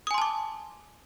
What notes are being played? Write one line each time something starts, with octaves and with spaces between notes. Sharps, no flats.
G#5 A5 C6 D6 D#6